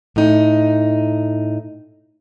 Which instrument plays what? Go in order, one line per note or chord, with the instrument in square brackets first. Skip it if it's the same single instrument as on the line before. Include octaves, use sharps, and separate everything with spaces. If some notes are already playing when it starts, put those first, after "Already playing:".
[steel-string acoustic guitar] A2 D#4